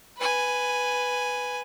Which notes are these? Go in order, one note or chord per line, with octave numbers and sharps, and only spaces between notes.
B4 G#5